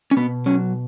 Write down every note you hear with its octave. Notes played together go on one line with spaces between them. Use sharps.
C#4
B2 B3
F#3 C#4